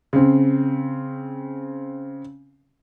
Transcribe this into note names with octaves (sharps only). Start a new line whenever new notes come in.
C#3 C4